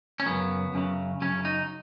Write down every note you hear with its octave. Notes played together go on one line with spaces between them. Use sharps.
C#4
F#2 C#3 F#3 B3
F#2 C#3 F#3
F#2 C#3 F#3 C#4
D#4